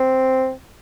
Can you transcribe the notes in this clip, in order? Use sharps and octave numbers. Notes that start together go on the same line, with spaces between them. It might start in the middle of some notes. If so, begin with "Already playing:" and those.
Already playing: C4